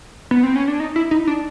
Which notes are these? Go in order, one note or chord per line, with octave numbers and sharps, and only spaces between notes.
B3
C4
C#4
D4
D#4
E4
D#4
D4